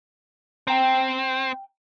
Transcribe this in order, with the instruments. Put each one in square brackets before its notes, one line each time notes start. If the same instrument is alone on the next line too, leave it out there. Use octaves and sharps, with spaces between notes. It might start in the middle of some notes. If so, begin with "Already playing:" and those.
[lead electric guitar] C4 [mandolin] G5 A#5 F6